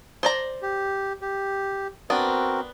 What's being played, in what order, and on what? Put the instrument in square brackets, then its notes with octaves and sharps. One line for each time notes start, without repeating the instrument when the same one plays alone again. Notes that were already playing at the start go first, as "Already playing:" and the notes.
[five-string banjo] C5 D5 A#5
[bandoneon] G4
G4
[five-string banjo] B3 D4 [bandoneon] C4 F#4 A#4